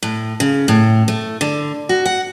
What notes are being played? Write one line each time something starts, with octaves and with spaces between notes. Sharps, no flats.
A2
C#3
A2
A3
D3
F#4
F#5